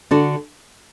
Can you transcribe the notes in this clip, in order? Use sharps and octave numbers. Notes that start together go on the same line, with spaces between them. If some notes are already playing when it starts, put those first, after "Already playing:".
D3 D4 F#4